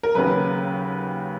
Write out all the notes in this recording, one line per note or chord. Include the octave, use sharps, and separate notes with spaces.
A#4
D#2 C#3 F#3 B4